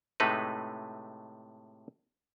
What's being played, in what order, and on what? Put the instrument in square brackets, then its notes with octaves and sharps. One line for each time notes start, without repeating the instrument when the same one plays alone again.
[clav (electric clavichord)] A2 C3 G#3 A3 D#4 B4